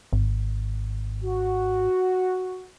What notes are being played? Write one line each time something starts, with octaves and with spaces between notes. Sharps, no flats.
G#1
F#4